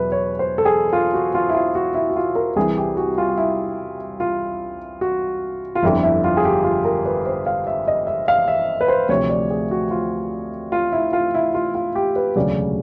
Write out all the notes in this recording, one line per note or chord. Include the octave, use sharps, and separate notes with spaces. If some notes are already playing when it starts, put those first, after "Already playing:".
Already playing: E2 B2 F#3 B4 E5
C#5
C5
A4
G#4
F4
F#4
F4
E4
F4
F#4
E4
F#4
F4
A#4
C2 C3 E3 G#4
G4
F#4
F4
E4
F4
F#4
F4
G1 F2 D3 E4
E4
F4
G#4
G4
F4
A#4
B4
C5
F5
E5
D#5
E5
F5
E5
B4
C5
D2 C3 F3 C#5
D5
G#4
F#4
F4
F4
E4
F4
E4
F4
F4
G4
B4
E1 D2 C#3 F#3 D5